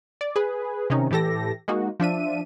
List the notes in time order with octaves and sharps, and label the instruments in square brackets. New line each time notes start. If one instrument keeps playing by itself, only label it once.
[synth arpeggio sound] D5
G#4 B4
C3 D#3 C#4 D#4
A2 E3 G4 A4 A#6
G#3 A#3 D#4 F#4
F3 D4 E5 D#7